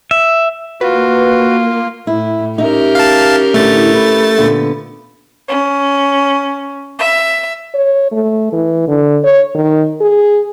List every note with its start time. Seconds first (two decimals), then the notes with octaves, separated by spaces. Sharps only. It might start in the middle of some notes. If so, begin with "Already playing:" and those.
0.11 E5
0.81 A#3 F4 F#4 B4
2.07 A2 E4
2.58 C#4 D#4 G4 A#4 E5
2.95 F5 A5
3.54 A2 D3 A3 D4 A6
3.93 B4
4.38 A#2 D3 B3
5.49 C#4
6.99 E5
7.74 C#5
8.12 A3
8.53 E3
8.88 D3
9.24 C#5
9.55 D#3
10.01 G#4